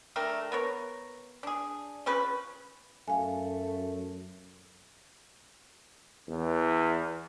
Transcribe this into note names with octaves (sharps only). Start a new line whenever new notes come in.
A3 D4 A#4 G5
B3 A#4 C#5
D4 G#4
C#3 F3 C#4 B4
F#2 A3 F5 G#5
E2